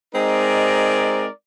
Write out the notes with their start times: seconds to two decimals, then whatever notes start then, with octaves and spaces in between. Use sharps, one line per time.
0.15 G#3 C4 D#4 A#4 D5